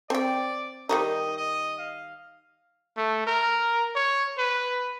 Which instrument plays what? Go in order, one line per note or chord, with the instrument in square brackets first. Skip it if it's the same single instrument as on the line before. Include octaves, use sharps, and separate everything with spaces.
[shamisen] C4 G5 [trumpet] D5
[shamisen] D#3 G3 D#4 [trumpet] D#5
[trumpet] D#5
F5
A3
A#4
C#5
B4